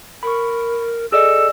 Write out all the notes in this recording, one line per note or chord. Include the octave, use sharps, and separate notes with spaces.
A#4 B5 C#6
G#4 A4 D5 D#5 E6